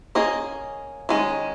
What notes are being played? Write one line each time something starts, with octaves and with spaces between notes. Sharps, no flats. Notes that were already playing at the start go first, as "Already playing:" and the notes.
A#3 C#4 G#4 D#5
D#3 G#3 C#4